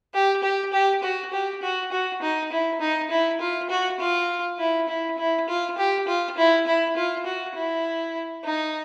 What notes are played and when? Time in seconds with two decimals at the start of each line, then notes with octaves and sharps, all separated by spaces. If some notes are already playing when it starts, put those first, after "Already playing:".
0.14 G4
0.43 G4
0.73 G4
1.03 F#4
1.33 G4
1.62 F#4
1.92 F#4
2.22 D#4
2.52 E4
2.81 D#4
3.11 E4
3.41 F4
3.70 F#4
4.00 F4
4.59 E4
4.89 E4
5.18 E4
5.49 F4
5.78 G4
6.08 F4
6.37 E4
6.67 E4
6.97 F4
7.26 F#4
7.55 E4
8.45 D#4